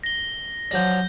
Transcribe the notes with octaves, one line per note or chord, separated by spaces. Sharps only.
A#6 G7
F3 F#3 D4 G6 A#6